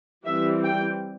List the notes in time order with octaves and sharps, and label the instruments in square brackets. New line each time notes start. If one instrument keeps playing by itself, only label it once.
[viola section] E3 G3 C4 E5
G5